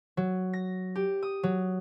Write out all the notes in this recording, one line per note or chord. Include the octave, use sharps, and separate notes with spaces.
F#3
A#6
G4
D#6
F#3